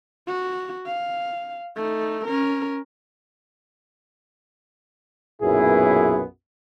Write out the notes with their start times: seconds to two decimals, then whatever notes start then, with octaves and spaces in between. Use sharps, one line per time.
0.27 F#4
0.86 F5
1.76 A3 D#4
2.25 C#4 A#4
5.42 B1 F#2 A#2 B3 E4 G#4